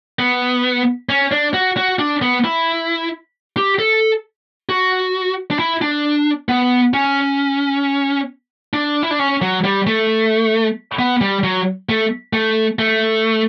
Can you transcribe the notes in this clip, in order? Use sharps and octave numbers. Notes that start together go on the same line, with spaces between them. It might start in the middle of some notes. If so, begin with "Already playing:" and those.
B3
C#4
D4
F#4
F#4
D4
B3
E4
G4
A4
F#4
D4
E4
D4
B3
C#4
D4
E4
D4
C#4
F#3
G3
A3
B3
G3
F#3
A3
A3
A3